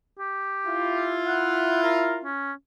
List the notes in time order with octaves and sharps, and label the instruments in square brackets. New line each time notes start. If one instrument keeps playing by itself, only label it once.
[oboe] G4
[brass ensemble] E4 F4
[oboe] F#5
A#4
C#4